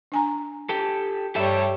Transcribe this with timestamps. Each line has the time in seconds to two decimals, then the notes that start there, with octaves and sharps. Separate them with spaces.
0.12 D4 G#5 A#5
0.69 G4 A4
1.35 G2 G3 G4 A4 C#5 E5